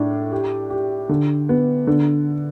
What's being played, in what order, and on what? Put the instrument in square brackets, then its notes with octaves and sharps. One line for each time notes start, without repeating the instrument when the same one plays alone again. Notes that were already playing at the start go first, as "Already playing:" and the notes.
Already playing: [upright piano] A2 D4
G4
G4
D3
B3
D3